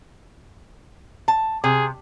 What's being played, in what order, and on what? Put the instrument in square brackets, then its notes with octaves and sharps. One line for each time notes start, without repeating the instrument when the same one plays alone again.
[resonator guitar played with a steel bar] A5
[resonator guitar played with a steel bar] C3 [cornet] G#4